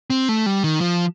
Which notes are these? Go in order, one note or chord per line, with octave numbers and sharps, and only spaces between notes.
C4
A3
G3
D#3
F3